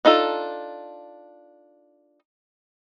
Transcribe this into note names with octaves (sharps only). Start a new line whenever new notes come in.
D4 D#4 F4 A4